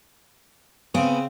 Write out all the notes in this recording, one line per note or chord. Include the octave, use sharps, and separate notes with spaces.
C#3 B3 C4 G#5